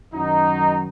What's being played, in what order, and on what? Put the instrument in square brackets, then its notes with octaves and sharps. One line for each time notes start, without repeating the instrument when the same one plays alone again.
[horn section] F#2 D#3 F#3 D#4